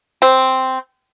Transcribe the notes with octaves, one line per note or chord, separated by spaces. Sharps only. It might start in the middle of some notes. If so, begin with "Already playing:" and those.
C4